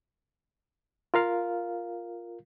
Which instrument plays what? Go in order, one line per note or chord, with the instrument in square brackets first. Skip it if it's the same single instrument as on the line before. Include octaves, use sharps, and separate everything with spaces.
[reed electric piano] F4 A#4 F5